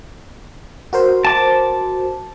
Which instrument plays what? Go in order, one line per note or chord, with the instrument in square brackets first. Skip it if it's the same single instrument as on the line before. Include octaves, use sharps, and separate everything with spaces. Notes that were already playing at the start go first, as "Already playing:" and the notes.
[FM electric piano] F#4 A#4 C5
[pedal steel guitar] A5 D6